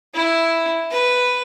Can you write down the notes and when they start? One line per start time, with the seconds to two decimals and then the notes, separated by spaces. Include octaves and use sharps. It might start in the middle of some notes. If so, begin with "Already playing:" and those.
0.14 E4
0.91 B4